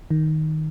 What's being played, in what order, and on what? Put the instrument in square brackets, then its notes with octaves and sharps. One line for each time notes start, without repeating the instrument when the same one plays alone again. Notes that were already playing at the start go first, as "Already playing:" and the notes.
[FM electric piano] D#3